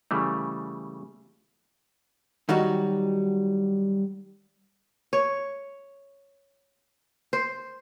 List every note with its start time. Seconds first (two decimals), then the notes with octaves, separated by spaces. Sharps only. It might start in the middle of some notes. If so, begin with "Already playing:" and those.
0.11 C#3 E3 G3 A3
2.49 D#3 F#3 G3 D#4 F#4
5.13 C#5
7.33 C5